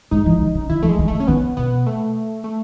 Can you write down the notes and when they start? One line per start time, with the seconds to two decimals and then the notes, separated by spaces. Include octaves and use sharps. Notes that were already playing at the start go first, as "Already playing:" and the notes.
0.11 G#2 D#4
0.26 E3
0.41 D#3
0.55 C#3
0.69 D#3 E4
0.83 E3 A3
0.89 G#3
0.99 D#3
1.08 A3
1.13 D#3
1.20 C#4
1.28 D#3 B3
1.57 B2 B3
1.86 A3
2.44 A3